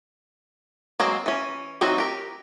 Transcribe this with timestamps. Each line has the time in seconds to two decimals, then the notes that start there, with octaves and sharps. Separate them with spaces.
1.00 F#3 G#3 A#3 C4
1.26 E3 C#4
1.81 E3 F#3 C4 D#4 F#4
1.98 G4 A#4